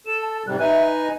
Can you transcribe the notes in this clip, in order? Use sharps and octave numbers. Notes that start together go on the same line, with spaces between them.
A4 E7
A5
G#2 C3 G3 F#6
D#4 B4 E5 G#5
D#5